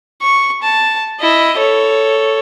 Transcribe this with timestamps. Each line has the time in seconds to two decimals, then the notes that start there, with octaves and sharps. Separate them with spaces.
0.22 C#6
0.62 A5
1.20 E4 D#5
1.57 A4 C#5